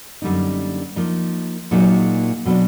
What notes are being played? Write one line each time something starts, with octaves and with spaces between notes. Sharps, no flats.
F#2 D3 G3 A#3 D#4
F3 A#3 D#4
A#2 F#3 A#3 D#4 G#4
B2 F#3 B3 D4